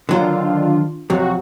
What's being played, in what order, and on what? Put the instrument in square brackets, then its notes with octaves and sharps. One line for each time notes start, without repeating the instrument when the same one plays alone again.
[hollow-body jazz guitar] D3 F#3 C5 [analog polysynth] D#3 D4 F4
[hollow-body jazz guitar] F2 C3 F#3 [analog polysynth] F#4